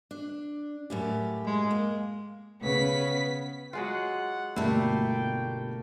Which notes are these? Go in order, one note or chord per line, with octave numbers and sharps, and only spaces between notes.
D4
F#2 A2 G4
G#3
A#3
C#3 B3 B6
F#3 G#3 F4 F#5
G1 B2 G3 A3 A#3 E4 G5